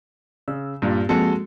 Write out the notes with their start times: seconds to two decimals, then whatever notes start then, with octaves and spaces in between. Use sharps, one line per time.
0.48 C#3 E6
0.82 G2 A#2 G3
1.09 F3 G#3 A#3 C4 F#4 A4